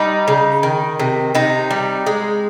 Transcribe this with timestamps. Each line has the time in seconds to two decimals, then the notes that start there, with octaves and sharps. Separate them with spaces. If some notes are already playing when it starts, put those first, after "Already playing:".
Already playing: G3 D#4
0.28 C#3
0.63 D#3
1.00 C3
1.35 C3 D#4
1.71 G3
2.07 G#3